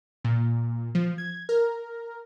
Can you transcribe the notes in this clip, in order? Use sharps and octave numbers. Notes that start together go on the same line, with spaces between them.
A#2
F3
G#6
A#4